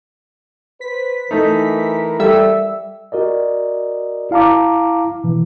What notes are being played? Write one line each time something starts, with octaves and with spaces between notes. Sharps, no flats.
B4 C5 B6
E3 A3 D#4 A#4
G3 A4 E5 E6
F#4 A#4 D5 D#5
E4 F5 A5 A#5 D6
B2 E3